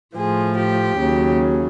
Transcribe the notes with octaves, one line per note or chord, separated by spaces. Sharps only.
A2 F3 G#4
G4
D#2 C#3 F#3